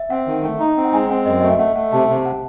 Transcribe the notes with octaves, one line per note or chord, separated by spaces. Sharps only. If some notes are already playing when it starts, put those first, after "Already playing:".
Already playing: E5
C4 F#5
D#3
A3
D#4
C4
F#5
G#3 G#5
C4 F#5
F#2 D#5
A3 D#5
E5
A3 F#5
A3 F#5
C3 A5
C3
F#5